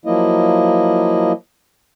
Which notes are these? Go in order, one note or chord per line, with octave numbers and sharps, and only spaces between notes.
F3 F#3 A#3 E4 D#5